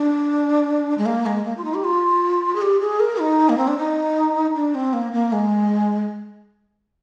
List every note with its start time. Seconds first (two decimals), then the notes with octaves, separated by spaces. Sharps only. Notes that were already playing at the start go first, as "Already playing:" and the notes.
Already playing: D4
0.98 G#3
1.06 A#3
1.26 G#3
1.45 A#3
1.57 F4
1.65 D#4
1.74 G4
1.84 F4
2.55 G#4
2.62 G4
2.81 G#4
3.00 A#4
3.20 D#4
3.49 A#3
3.58 C4
3.68 D4
3.77 D#4
4.55 D4
4.75 C4
4.93 A#3
5.13 A#3
5.33 G#3